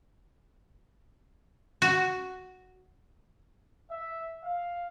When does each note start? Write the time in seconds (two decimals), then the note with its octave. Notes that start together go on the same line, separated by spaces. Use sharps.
1.82 F#4
3.89 E5
4.42 F5